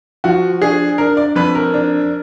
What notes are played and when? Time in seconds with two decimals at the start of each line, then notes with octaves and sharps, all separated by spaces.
0.24 F3 F#4
0.62 D4 G#4
0.98 D4 A#4
1.17 D5
1.35 F2 B4
1.55 A#4
1.74 D4